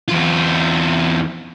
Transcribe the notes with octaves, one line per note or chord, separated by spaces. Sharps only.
E2 F4